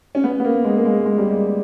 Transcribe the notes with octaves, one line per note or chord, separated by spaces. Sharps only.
C#4
B3
B3
A#3
G#3
A#3
G#3
G#3
G3
G#3